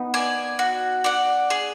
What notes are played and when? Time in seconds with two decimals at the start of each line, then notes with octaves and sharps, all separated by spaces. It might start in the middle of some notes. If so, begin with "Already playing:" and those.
Already playing: B3 D#4
0.14 D5 G#5
0.59 F#4
1.04 D5 F#5
1.50 G#4